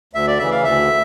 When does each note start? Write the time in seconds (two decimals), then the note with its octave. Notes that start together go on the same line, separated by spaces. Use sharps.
0.13 D2 E5
0.27 D5
0.39 C#3 E3 E5
0.51 F5
0.64 D2 E5